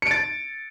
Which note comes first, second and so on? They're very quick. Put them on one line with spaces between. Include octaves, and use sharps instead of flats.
C#7 D7 A6